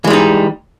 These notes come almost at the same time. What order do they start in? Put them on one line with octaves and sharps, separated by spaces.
E3 G#3 G3 D#4